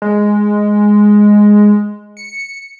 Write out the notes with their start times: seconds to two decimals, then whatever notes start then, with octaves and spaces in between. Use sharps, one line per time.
0.02 G#3
2.17 C#7